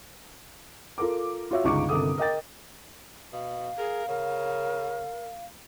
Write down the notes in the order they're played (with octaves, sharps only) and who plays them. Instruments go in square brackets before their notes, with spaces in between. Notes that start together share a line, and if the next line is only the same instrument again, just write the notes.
[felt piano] F4 A4 A#4 D6
F4 F#4 C#5 E5
G1 C#2 D#4 C#6 D6
G1 C3 D#3 A4 D#6
A#4 D#5 G5 A6
[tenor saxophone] B2 [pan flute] F5
[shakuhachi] G#4 [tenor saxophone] A#4
[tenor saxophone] C#3 [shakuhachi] A#4